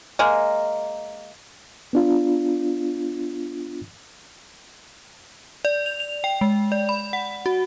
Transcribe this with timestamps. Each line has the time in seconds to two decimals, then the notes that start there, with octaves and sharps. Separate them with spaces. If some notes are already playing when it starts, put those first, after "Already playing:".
0.19 G#3 A#3
1.93 B3 D4 F4
5.65 D5
5.86 F7
6.00 F7
6.24 G5
6.41 G#3
6.72 D5
6.89 B5
7.13 F#5
7.46 F#4